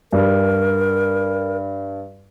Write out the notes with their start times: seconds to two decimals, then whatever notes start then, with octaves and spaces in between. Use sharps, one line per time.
0.13 G2 A#4